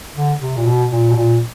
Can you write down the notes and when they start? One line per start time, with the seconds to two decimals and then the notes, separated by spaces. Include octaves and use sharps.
0.15 D3
0.40 C3
0.57 A#2
0.66 B2
0.90 A#2
1.10 B2
1.16 A#2